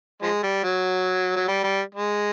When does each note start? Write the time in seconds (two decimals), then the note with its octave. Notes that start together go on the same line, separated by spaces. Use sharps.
0.22 F3 G#3
0.43 G3
0.64 F#3
1.36 F#3
1.48 G3
1.64 G3
1.95 G#3